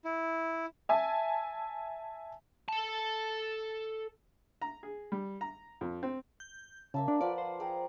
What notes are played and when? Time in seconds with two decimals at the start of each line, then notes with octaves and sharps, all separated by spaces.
0.05 E4
0.89 E5 G#5 A5
2.69 A4 A5
4.62 A#5
4.83 G#4
5.12 G3
5.41 A#5
5.81 F2
6.03 C4
6.40 G6
6.94 C#3 A#3 E5 A5
7.08 D4 D5
7.21 F3 B4 D5 F#5
7.38 C5
7.60 G#4 G5 A#5